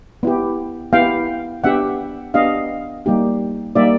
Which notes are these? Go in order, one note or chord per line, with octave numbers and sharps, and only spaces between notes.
B3 E4 G4
B3 E4 G4 F5 G5
B3 D4 G4 E5 F#5
B3 D4 G4 D#5 F5
G3 A#3 D#4 G4
G3 A#3 D#4 G4 D5 E5